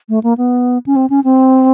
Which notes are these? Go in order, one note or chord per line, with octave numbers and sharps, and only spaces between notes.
A3
A#3
B3
C#4
C4
C#4
C4